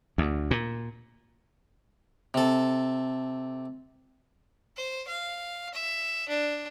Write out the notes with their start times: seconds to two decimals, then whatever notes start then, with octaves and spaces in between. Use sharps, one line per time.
0.18 D2
0.51 A#2
2.34 C3 A4
4.77 C5
5.08 F5
5.74 E5
6.29 D4